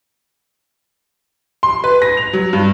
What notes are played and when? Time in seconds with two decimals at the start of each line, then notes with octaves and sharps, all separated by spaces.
1.63 C6
1.84 B4
2.02 A#6
2.17 F7
2.33 F#3
2.53 G2